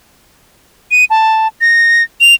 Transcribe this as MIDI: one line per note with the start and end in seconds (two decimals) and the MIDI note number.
0.91 1.05 99
1.10 1.48 81
1.61 2.03 94
2.21 2.34 101